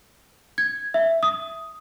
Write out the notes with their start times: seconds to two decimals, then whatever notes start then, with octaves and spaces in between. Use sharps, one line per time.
0.58 G#6
0.94 E5
1.23 D#6